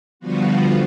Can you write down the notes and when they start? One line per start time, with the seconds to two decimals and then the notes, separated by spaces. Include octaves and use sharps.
0.20 D3 F3 G3 B3 F4 F#4